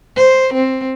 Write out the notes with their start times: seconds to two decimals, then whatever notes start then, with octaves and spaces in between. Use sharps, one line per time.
0.16 C5
0.54 C4